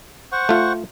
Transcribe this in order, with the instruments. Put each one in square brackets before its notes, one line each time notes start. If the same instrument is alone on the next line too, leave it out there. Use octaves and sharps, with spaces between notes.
[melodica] C5 F#5 C#6
[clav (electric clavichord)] A3 F4